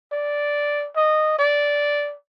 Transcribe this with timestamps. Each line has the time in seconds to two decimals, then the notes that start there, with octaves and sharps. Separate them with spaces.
0.12 D5
0.96 D#5
1.39 D5